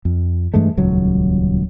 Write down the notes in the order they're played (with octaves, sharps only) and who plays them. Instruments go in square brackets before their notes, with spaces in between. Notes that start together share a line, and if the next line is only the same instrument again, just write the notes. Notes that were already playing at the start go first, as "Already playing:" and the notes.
[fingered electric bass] F2
G2 E3 G#3 A3
D#1 C#2 F#3